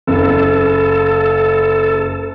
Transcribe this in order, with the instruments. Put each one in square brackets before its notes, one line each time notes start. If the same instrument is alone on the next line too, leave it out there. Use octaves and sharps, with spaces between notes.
[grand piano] F#1 [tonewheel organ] A4